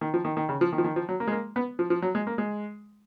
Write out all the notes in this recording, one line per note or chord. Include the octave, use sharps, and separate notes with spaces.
D#3
F3
D#3
D#3
C#3
F3
D#3
F3
D#3
F3
F#3
A#3
G#3
A#3
B3
F3
F3
F#3
G#3
A#3
G#3